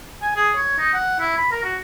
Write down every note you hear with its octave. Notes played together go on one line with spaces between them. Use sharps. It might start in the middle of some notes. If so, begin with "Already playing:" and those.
G#5
G#4
C#5
D#4
F#5
E4
B5
A#4
F#4